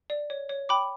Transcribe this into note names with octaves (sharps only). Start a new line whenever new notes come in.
D5
C#5
C#5
G5 B5 D6